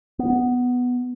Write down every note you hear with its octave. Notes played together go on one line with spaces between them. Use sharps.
B3